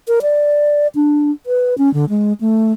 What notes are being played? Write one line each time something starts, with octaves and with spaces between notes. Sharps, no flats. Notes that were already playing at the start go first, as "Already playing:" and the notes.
A#4
D5
D4
B4
C#4
D3
G#3
A3